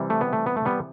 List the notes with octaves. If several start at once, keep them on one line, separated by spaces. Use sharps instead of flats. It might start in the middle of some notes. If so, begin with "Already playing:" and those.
Already playing: C3 E3 G3
A3
B3
A3
B3
A3
G3 B3